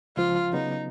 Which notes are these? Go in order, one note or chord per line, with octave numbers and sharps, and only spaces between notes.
C#2 F3 F4
C#3 F#3 B3 D#4